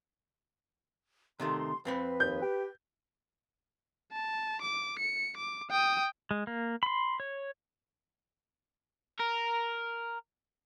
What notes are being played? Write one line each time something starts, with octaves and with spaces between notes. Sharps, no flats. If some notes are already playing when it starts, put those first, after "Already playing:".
C3 D#3 A3 C6
F2 C4 B4 B5
D#2 G6
G4
A5
D6
C#7
D6
G5 D#6
G#3
A#3
B5 C6
C#5
A#4